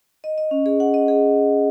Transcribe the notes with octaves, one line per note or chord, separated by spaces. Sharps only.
D#5
D#5
C#4
G#4
F#5
D#5
G#4